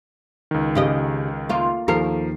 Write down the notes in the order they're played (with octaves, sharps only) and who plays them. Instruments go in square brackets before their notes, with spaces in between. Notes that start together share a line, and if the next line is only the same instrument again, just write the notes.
[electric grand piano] C#2 D#3
[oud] C#3 G4 D#5
A#3 F4
[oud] D#2 A#4 [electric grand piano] F3 C7